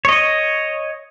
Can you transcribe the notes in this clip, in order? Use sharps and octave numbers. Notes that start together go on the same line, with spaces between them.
C#5 D#5